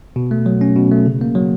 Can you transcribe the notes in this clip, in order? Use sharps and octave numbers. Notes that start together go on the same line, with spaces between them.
B2
A3
F#3
C#4
B2
A3
C#3
A#3
F#3